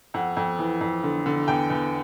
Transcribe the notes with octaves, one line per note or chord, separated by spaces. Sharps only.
F2 F#5
F2
E3
F2
D3
D3
E2 G5
E2